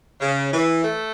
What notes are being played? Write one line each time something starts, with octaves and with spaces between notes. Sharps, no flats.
C#3
E3
A3